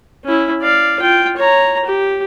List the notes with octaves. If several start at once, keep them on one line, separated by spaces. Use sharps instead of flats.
C#4 E4
D5 F5
F4 G5
C#5 A#5
G4